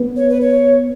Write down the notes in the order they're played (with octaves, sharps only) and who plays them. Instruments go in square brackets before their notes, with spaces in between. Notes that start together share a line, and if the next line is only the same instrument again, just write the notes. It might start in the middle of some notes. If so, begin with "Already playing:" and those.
Already playing: [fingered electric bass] B3
[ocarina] C#5
B4
C#5